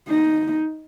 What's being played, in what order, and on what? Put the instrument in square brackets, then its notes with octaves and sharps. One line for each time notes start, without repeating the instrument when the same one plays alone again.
[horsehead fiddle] D#4